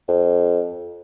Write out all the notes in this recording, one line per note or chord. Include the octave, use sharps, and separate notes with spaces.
F2